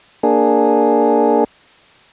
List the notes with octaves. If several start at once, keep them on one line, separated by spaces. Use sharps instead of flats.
A#3 D4 G#4